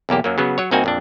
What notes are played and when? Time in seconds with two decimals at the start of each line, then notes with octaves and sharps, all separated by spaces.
0.09 B1 E2 A#3 G4
0.24 F#2 F#3 A#3
0.38 C#3 F#3 B3
0.58 F#3 C#5
0.71 C2 A#3 C4 D#4 F#4 G#5
0.84 A#1 F2 D4